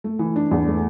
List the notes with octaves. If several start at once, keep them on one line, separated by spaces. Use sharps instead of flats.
A3
E3
D4
E2
A3